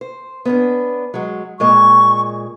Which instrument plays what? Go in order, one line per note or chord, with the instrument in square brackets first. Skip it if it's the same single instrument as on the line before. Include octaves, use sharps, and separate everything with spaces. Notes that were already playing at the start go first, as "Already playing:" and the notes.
[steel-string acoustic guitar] C5
B3 C#4 D4
F#3 G#3
[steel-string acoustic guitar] A#2 G#3 D#5 [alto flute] C#6